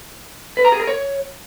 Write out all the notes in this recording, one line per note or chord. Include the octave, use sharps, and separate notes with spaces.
B4
A#5
G#4
A#4
C#5